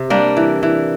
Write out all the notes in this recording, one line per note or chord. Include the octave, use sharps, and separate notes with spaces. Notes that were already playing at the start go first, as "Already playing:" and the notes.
Already playing: C3
G3 A#3 D4
E3
E3